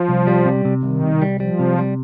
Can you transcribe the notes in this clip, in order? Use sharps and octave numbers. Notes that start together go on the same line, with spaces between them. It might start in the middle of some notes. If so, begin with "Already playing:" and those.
Already playing: F3
C2
G3
C3
C3
C2 D#3
C2
G3
F3 G3
C3
G3